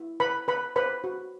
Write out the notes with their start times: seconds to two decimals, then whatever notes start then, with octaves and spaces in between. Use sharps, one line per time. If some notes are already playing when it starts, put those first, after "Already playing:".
Already playing: E4
0.20 B4 B5
0.48 B4 B5
0.76 B4 C5 B5
1.04 F#4